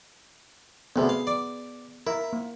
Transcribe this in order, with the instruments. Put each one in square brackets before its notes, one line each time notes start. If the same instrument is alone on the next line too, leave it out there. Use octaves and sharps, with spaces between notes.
[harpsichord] D2 C3 [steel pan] B3 G#4
[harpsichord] F5
D5
[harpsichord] E4 [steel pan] A#4
[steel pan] A#3